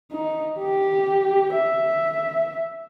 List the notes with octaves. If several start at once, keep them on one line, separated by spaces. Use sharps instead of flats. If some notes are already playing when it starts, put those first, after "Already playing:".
D#4
G4
E5